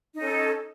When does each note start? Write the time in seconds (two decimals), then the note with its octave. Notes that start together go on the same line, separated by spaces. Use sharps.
0.14 D#4
0.18 C#4
0.21 A4